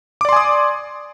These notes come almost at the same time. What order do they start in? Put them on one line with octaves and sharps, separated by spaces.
D6 D5 C6 G#5 D#6